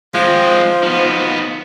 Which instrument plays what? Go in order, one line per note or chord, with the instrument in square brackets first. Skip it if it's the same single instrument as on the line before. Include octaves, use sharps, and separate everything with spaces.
[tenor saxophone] F3 [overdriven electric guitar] G#3 C4
[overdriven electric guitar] D#3 B3